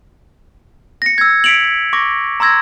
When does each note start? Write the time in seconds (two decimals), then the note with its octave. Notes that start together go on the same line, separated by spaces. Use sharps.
1.02 A#6 C#7
1.18 E6 G#6
1.44 B6 C#7 D7 F7 F#7
1.93 C#6 D6 A#6
2.40 A#5 C6 E6 G#6 A#6